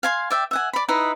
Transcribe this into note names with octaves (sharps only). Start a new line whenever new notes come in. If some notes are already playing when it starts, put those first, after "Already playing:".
F5 G#5 C6
D5 E5 G5
E5 F#5 G#5
D5 B5
D#4 E4 B4 D#5